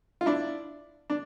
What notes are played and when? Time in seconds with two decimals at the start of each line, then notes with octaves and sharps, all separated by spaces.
0.21 F4
0.26 D4 E4
1.10 D4